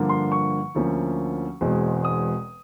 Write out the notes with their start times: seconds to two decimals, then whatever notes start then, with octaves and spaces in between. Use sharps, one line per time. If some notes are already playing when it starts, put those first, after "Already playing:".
Already playing: G2 D3 F3 A#3
0.09 C6
0.32 C#6
0.75 D2 D3 F3 A#3 C#4
1.61 E1 E2 B2 G#3 C4
2.04 D#6